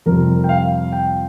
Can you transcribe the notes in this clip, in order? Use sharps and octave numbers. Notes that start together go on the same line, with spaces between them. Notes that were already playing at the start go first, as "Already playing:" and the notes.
F2 C3 G3 A#4
G5
F5
G5